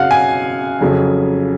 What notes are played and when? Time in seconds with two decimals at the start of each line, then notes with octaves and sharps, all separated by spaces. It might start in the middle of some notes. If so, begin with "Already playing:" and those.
Already playing: F#2 C#3 F#3 F5 F#5
0.11 G#5
0.81 F2 C#3 F#3